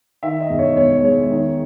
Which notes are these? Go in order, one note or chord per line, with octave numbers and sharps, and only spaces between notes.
D#3 E5
D#5
E1
C#5
E1 C#5
G#3 C#5
D#3